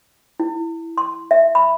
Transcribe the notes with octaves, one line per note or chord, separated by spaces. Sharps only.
E4
C6
E5
B5